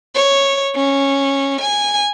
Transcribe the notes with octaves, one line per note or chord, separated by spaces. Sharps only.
C#5
C#4
G#5